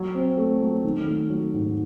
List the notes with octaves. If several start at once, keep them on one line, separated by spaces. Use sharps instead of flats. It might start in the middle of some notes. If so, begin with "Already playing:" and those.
Already playing: F#3
C4
A3
F#3
D#3
A3
F#3
G#2